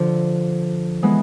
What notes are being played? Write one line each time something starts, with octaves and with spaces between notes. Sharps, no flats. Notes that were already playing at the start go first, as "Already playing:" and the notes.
Already playing: D3 F3
E3 G#3 B3